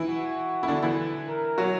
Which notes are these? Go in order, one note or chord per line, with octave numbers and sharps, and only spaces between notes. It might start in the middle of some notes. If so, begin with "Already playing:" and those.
Already playing: E3 E4
F#4
E4
D3 D4
E3 E4
A#4
F#3 F#4